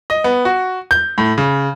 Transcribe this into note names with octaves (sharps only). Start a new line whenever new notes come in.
D#5
B3
F#4
G6
A2
C#3